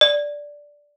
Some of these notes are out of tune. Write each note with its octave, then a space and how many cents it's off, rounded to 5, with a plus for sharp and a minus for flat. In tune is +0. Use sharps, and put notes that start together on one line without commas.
D5 -5